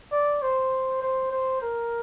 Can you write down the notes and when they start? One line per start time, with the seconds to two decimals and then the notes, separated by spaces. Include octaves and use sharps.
0.12 D5
0.42 C5
1.02 C5
1.31 C5
1.62 A#4